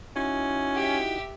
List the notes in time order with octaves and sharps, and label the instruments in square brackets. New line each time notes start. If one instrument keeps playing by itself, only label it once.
[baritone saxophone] C#4 [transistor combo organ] D#4 E4 F#4
[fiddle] G4 E5